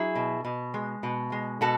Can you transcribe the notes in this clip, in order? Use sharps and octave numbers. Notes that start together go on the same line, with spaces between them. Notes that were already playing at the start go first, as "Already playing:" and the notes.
Already playing: F#3 E4 G#4
B2
B2
G#3
B2
G#3
B2 F#4 A4